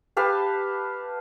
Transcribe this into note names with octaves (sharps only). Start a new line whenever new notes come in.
G4 B4 F5 A5